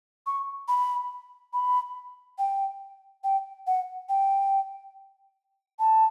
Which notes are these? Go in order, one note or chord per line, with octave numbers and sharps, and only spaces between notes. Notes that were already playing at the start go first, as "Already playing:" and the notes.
C#6
B5
B5
G5
G5
F#5
G5
A5